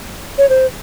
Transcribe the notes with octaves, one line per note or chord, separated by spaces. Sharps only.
C#5
C5